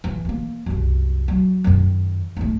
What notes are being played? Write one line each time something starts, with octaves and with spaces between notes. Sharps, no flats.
E3
G#3 A#3
C2 F#2
F#3
F#2 D#3
A3 D#4